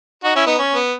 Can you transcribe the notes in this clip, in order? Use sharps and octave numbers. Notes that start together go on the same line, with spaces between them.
D#4 F#4
C#4 E4
B3 D#4
C#4
B3